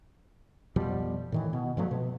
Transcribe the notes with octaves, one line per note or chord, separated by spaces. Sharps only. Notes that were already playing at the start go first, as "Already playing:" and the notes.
F2 B2 F3 G3
A2 D#3 E3
B2
G2 F3 F#3 A3
B2